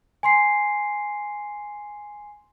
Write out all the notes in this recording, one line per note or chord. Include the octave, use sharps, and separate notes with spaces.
G#5 C6 C7